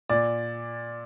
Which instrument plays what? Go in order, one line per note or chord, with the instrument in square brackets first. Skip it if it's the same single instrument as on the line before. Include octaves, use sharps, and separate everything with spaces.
[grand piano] A#2 D5